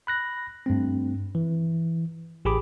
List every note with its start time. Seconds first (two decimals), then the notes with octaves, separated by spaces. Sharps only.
0.07 B5 F#6 A#6
0.66 G2 A3 C4
1.35 E3
2.45 A1 G4 G#4 B5 D6